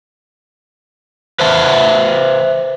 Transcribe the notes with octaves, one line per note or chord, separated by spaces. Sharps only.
B4 C5 E5 A5